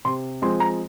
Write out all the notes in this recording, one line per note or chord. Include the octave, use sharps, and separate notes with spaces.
C3 C6
F3 G#3 C4 C6
A#5